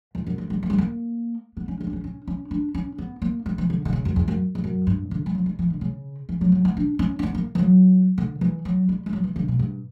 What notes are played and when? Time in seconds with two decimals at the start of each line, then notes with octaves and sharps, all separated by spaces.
0.15 E2
0.27 F#2
0.38 E3
0.50 G3
0.63 A#3
0.70 G3
0.78 A#3
1.57 B3
1.68 C#4
1.81 C#4
1.87 D4
1.93 C#4
2.04 C#4
2.28 C#4
2.51 D4
2.75 C#4
2.98 B3
3.22 A#3
3.46 G3
3.58 E3
3.70 D3
3.85 D3
3.93 C#3
4.05 F#2
4.16 E2
4.28 F#2
4.55 E2
4.64 F#2
4.87 G2
5.11 D3
5.26 G3
5.35 F#3
5.46 G3
5.59 E3
5.70 D3
5.81 C#3
6.29 E3
6.41 F#3
6.52 F#3
6.65 B3
6.77 D4
6.99 C#4
7.19 C#4
7.23 B3
7.35 A#3
7.55 E3
7.59 F#3
8.18 D3
8.41 E3
8.65 F#3
8.89 G3
9.06 G3
9.13 F#3
9.24 E3
9.36 D3
9.48 B2
9.59 G2